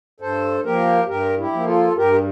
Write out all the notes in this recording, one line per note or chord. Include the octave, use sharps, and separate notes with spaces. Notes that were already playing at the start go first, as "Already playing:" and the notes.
G2 A4 C5
F3 A#3 G4 A#4
G2 G4 A#4
E4 G4
F3 A#3
F4 A4
G2 G4 A#4
G4